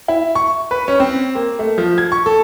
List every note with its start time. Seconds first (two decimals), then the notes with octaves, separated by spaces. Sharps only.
0.08 E4
0.35 C#6
0.71 B4
0.88 C#4
1.00 C4
1.35 A#3
1.59 A3
1.78 F3
1.98 G#6
2.12 C#6
2.26 A4